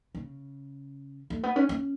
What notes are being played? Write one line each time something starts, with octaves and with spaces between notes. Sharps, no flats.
C#3
A3
B3
C#4
C#4